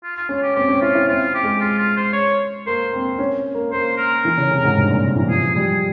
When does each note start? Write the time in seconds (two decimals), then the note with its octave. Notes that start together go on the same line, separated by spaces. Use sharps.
0.04 F4
0.17 F4
0.29 C#4 F4
0.43 G4
0.55 C4 G4
0.69 C#4
0.82 E4 F4
0.95 E4
1.08 C4 F4
1.35 G4
1.43 G#3
1.61 F4
1.78 F4
1.97 C5
2.13 C#5
2.66 A#3 C5
2.93 C4
3.19 C#4
3.54 A#3
3.72 A#3 C5
3.98 A#4
4.25 E3
4.37 C#3
4.51 C3
4.64 G#2
4.77 G2
4.90 A#2
5.03 C3
5.16 E3
5.30 F3 G#4
5.55 G3 G#4